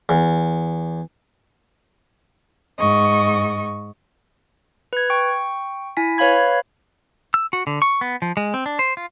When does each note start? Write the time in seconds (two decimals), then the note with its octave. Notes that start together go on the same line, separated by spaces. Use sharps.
0.09 E2
2.79 G#2 D#5 C#6
4.93 B4 G#6
5.10 G5 C#6
5.97 E4 G#5 B6
6.18 B4 C#5 F5 B5 G#6
7.34 E6
7.53 F#4
7.67 D3
7.82 C#6
8.01 B3
8.22 F3
8.37 G#3
8.54 C4
8.66 D4
8.79 C5
8.97 F4